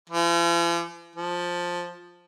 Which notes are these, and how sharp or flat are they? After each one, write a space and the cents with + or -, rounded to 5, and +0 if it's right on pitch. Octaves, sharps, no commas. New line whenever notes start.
F3 -45
F3 +10